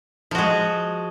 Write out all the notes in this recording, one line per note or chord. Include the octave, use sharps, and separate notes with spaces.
F3 G#3 F#4